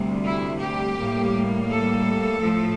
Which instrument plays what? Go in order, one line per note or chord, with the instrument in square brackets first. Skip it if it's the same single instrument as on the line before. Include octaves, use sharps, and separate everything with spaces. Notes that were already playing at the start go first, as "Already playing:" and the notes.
Already playing: [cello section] D2 C3 G3
E4
G4
A2 G3 A#3
A4
A2 F3 A3